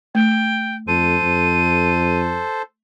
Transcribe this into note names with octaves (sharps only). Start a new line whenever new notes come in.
A3 G5
F2 A4 C5 D#7
F2